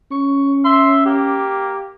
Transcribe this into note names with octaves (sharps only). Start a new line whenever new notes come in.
C#4 C#6
E5 C6
A#3 G4